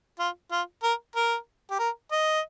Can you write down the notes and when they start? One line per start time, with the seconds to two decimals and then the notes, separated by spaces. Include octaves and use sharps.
0.19 F4
0.51 F4
0.83 A#4
1.16 A#4
1.71 G4
1.79 A#4
2.12 D#5